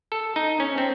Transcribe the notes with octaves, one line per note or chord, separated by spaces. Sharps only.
A4
D#4
C#4
C4